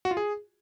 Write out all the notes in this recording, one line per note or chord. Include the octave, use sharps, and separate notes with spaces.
F#4
F4
G#4